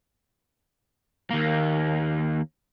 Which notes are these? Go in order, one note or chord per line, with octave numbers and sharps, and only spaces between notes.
D#2 A#3